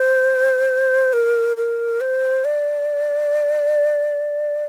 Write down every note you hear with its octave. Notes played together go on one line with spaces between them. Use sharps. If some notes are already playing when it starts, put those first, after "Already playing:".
Already playing: C5
A#4
A#4
C5
D5